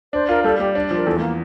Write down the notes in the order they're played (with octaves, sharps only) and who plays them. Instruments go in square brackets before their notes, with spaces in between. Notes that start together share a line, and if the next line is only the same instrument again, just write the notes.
[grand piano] D4 [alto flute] C5
[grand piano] F4 [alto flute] A#4
[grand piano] G3 [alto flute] A4
[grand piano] G3 [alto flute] G4
[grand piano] D4
F3
[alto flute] A#4
[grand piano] E2 [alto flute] A4
[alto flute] A3
A#3